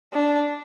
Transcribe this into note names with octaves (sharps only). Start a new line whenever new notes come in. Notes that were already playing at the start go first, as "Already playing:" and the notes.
D4